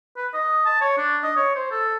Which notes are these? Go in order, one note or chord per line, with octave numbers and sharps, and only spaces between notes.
B4
D#5
A5
C#5
D4
D#5
C#5
C5
A4